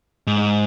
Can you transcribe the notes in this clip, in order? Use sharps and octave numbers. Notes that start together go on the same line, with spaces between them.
G#2